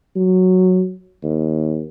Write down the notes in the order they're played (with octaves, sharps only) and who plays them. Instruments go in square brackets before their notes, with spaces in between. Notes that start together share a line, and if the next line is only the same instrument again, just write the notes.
[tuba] F#3
D#2